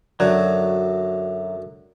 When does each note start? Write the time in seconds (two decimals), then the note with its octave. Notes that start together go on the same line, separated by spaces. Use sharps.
0.20 F#2 D3 F#3 D5 E5